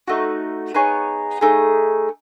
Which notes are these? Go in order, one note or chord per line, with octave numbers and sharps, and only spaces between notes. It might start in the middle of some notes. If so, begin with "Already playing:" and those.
A3 D#4 F#4
B3 D#4 G#4 C#5
A3 D#4 G#4